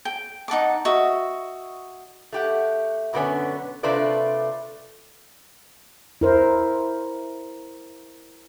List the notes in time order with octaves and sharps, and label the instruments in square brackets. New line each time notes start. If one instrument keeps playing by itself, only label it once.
[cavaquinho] G5
D#4 F#5 A5 D6
F#4 D#5 E5
[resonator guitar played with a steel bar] A3 G4 F#5
F#2 B2 D3 A#3 B3 C#4
C3 A3 D4 F4 B4 D5
[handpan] E4 A#4 C5